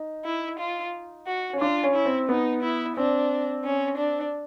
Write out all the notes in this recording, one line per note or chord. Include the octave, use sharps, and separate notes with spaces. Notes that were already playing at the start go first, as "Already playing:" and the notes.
Already playing: D#4
E4
F4
F#4
C#4
D4 F4
C#4
E4
C4
B3 D#4
E4
C4 D4
C#4
D4